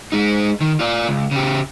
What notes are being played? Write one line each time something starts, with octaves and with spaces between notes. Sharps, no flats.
G#3 D#4
D#3
F4 D5
C#2
C#3 G4